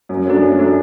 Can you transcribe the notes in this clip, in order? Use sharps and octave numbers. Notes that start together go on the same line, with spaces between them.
F#2
F#3 A3 D4
F#2
F#3 A3 D4